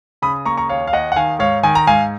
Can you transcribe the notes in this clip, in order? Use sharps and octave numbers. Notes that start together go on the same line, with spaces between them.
C#3 B5 D#6
A#3 A#5 C#6
A#5 C#6
D#2 C#5 F5
F5
D#2 D#5 F#5
F#5
D#3 F5 G#5
G#2 C#5 F5
D#3 G#5
A#5
G#2 F5 G#5